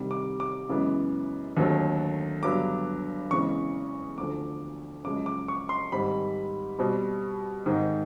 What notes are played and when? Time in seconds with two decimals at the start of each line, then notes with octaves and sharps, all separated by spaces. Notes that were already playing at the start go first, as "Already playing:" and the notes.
Already playing: C2 C3 D#3 G3
0.11 D6
0.40 D6
0.69 F#2 C#3 E3 G#3 B3
1.57 D#2 D3 F#3 A3 C4
2.43 G2 D3 F#3 B3 D6
3.31 E2 C#3 E3 G#3 C4 C#6
4.18 D2 D3 F3 A3 D6
5.05 F#2 C#3 F3 G#3 D6
5.26 D6
5.48 C#6
5.69 C6
5.92 G#2 D#3 G3 C4 B5
6.79 B2 G3 C4
7.66 G#2 D#3 G#3 C4